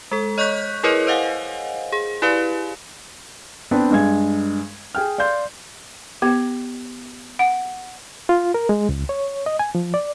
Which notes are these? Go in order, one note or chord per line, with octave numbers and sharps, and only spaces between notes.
G#3 A4
C#5 D#5 C#6 F#6 G6 B6
E4 G#4 A#4 B4 C#5 D#5
C5 D#5 F5 F#5 G#5
G#4
E4 G4 B4 D5 F5
B3 C4 D4 B4
G2 G#3 G#6
G#4 G5 F6
D5 F5 C6 G6
B3 G4
F#5
F4
A#4
G#3
C#2
C#5
D#5
G#5
F3
D5